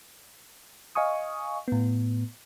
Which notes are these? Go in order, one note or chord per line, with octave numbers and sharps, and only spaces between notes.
D#5 F5 G#5 C#6 D#6
A2 B3